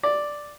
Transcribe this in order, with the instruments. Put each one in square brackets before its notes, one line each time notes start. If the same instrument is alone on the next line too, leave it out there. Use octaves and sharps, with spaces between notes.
[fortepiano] D5